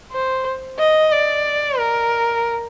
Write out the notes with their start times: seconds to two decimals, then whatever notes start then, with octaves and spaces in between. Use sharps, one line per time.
0.12 C5
0.79 D#5
1.12 D5
1.79 A#4